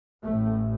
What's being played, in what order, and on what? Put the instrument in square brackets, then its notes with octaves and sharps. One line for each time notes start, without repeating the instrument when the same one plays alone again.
[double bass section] A1 A2 A3